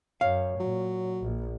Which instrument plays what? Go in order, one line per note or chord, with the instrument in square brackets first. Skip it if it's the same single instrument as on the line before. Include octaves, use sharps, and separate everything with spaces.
[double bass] F#2 [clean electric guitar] C#5 [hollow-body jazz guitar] F5
[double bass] A#2 [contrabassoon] F#3
[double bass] A#1